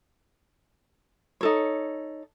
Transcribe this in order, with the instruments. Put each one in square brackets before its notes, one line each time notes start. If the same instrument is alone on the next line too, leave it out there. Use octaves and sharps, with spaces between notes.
[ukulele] D#4 A4 C#5